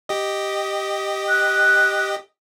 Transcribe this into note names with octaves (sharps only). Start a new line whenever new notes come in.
G4 D#5
F#6